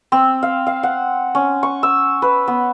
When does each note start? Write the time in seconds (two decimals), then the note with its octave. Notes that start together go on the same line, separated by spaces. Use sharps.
0.12 C4
0.43 F5
0.67 F5
0.83 F#5
1.35 C#4
1.63 C#6
1.83 E6
2.22 B4
2.48 B3